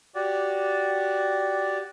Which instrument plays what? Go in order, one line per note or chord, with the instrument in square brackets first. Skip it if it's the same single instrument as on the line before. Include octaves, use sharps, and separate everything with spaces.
[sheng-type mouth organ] F#4 G4 D5